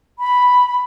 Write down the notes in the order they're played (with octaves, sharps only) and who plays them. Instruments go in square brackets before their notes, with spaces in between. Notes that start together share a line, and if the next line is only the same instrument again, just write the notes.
[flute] B5